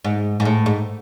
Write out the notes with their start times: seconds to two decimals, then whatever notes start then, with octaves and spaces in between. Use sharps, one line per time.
0.04 G#2
0.40 G#2
0.45 A2
0.66 G#2